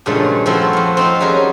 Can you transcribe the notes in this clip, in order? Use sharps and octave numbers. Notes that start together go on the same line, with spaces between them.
G2 A#2 C#3 F3 G#3 A3
F3 A3 C4 E4 F#4
F2 F4
C4 D#4 F4
G3 C#4 F#4 G#4 A#4